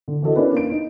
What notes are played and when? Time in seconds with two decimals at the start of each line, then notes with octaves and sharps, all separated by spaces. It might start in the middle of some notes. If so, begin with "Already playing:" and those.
0.08 D3
0.22 E3 F#4 A4 D#5
0.36 C#4 D4 E4 A#4 B4
0.53 A#3 D7
0.72 D#4